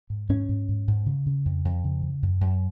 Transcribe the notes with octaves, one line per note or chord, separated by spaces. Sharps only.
G#2
G#2 C#4
G#2
G#2
G#2
C#3
C#3
F2
F2
C#3
C#3
F#2
F#2